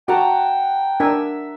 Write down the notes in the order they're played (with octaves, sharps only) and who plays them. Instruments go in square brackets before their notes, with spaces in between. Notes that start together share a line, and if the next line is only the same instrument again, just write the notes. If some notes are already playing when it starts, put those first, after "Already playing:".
[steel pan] F#4 [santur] F#5 A5 A#5 [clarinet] G5
[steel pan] D4 A#4 G#5 [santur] E5 E6